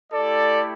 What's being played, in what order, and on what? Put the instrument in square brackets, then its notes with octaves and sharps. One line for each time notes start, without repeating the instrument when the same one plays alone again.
[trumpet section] A3 E4 G4 A4 D5